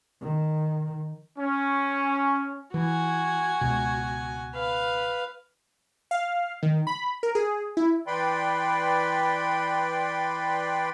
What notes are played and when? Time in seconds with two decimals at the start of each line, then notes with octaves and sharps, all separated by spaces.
0.21 D#3
1.39 C#4
2.74 E3 F#4 G#5
3.61 C#2 B2
4.55 B4 F5
6.11 F5
6.63 D#3
6.87 B5
7.23 A#4
7.35 G#4
7.77 E4
8.07 E3 B4 D5 G5 B5 C6